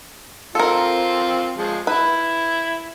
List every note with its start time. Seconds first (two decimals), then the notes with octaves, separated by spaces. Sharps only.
0.55 C4 F4 A4 A#4
1.57 F3 G#3
1.87 E4 B4